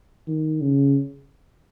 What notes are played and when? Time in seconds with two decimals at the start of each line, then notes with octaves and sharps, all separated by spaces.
0.27 D#3
0.61 C#3